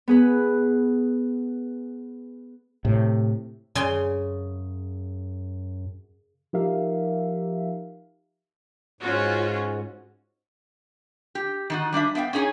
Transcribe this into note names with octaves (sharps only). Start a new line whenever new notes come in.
B3 G#4 B4
A2 C3
F#2 C#3 G#5 C6
F3 D#4 G4 A#4 E5 F5
G#2 C#4 F4 F#4
G4
D#3 D#4 F#4
G3 D4 D#5 E5
B3 E5 F5 G5
C#4 D#4 G#4 B4 C#5 G#5